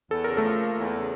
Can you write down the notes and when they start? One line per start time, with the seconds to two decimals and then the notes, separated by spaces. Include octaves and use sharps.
0.11 E2 A4
0.24 C#3 A#4
0.37 A3 A4
0.44 F3
0.61 A#3
0.77 E2
0.93 C#3